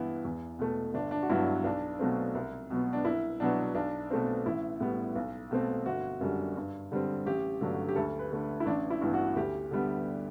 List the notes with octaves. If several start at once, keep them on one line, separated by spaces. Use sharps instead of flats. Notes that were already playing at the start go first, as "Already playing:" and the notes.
Already playing: G2 E3 B3 E4
E2
B2 A3
G1 D4
D4
F#4
G2 F#3 B3 E4
B1 D4
B2 F#3 A3 C4
C2
B2 F#3 B3
D4
C2 E4
B2 F#3 B3 D4
B1 D4
B2 A3 C4
A1 E4
A2 G3 B3
B1
B2 A3 C4
G1 F#4
F#2 D3 G3
G2
D3 G3 C4
A1 G4
G2 D3 F#3 A3
G4
D2 A4
B4
D3 A3
E4
A1 D4
E4
G2 E3 B3
F#4
D2 G4
D3 G3 B3